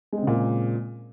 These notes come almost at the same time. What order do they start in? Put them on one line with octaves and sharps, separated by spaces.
G#3 C4 C#3 A#2